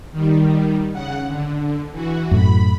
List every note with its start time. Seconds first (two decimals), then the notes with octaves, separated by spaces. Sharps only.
0.12 D#3 G3
0.92 C#3 F#5
1.28 D3
1.91 E3 F#4
2.31 F#2 A2 B5